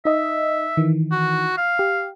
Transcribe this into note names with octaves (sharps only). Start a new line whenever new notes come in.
D#4 D#5 E5
D#3 E3
F#4
F5
G4